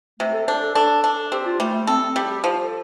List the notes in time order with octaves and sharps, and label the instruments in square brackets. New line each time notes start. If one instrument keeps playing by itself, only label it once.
[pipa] C3 [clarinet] A3
[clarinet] A4
[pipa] D4 [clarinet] C5
[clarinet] A4
[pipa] D4 [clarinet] A4
[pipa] D4
[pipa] C4 [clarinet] G4
[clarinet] F4
[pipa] G3 [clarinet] A3
[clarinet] A3
[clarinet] C4 [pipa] A4
[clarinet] C4
[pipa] G3 [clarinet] G4
[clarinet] G4
[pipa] F3 [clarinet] C5
[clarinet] A4